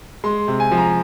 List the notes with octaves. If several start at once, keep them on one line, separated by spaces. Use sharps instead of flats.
G#3 C6
C3
G#5
F3
A#5